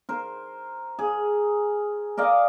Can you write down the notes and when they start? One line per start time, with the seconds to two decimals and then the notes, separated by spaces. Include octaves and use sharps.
0.09 A#4 C5
0.99 G#4
2.17 A#4 D5 D#5 F5